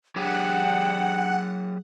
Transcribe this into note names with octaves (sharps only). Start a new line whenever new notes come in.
F#3 D4 G4 G#4 F#5 G5